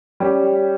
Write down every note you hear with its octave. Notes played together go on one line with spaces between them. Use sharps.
G3 C#4 G4